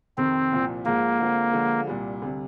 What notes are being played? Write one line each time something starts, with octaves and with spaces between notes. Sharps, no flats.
F2 C3 D#3 C4
C2 A#2 F3
G#2 F3 G#3 A#3
D3 G#3 C4 F4
D3 F3 G#3
C2 A#2 G3
D2 C3 G3